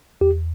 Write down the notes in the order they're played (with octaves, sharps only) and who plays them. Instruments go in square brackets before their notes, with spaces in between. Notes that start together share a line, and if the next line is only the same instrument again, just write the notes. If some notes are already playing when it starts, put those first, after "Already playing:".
[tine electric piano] E2 G4